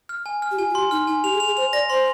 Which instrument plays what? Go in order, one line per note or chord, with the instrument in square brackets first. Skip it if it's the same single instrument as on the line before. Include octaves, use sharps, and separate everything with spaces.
[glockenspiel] F6
G#5
F6
[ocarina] G4
[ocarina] F4 [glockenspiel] G#5
[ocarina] F4
[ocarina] G4 [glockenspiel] C6
[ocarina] D#4 [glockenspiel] F6
[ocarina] D#4 [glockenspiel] G#5
[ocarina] G4 [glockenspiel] F7
[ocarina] G#4
[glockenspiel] F7
[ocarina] G#4
[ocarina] C5 [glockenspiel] F7
[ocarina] D5 [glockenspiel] A#6
[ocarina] C5 [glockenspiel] C6